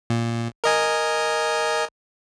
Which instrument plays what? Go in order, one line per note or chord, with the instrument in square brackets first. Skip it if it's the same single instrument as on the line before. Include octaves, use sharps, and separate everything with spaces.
[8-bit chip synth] A#2
A#4 D#5 G#5